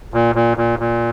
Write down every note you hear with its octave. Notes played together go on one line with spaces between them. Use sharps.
A#2
A#2
A#2
A#2